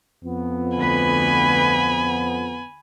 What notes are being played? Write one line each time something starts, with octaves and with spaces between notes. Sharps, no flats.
F2 B3
D2 B4 G#5 B5